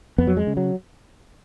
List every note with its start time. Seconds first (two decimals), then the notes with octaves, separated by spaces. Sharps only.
0.18 F2 B3
0.27 F#3
0.37 G#3
0.47 C#3
0.57 F#3